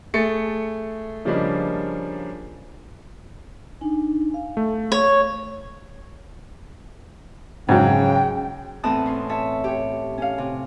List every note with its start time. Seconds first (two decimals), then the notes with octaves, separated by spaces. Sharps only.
0.14 A3 G#4 A6 C#7
1.25 C#3 F3 G3 A#3 D4 D#4
3.81 D4 D#4 G#5
4.34 F5
4.57 A3
4.92 C#5
7.69 G#2 C#3 F#3 G5
8.83 E2 A2 C4 A5 D#6 F#6
9.06 C#4 C6
9.29 C#5 E5 A5
9.64 G4 C#5
10.18 C#4 F5
10.38 C3